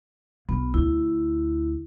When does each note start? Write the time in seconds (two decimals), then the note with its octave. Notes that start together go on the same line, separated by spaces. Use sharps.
0.49 B1 B3
0.74 D2 E4